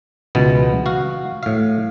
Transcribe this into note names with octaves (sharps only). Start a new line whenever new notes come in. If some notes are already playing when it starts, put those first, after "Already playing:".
C#2 B2 E3 B3
F#4 F5
A2 F5